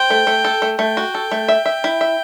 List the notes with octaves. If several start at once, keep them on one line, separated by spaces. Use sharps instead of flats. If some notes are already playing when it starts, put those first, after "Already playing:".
Already playing: C5 G5
A3
A3
A4
A3
A3 G5
F#4
A4
A3
E5
E5
E4
E5